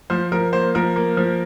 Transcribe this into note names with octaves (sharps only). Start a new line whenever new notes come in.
F3 C5
F3 A#4
A#3 C5
F3 A#4
A#3
F3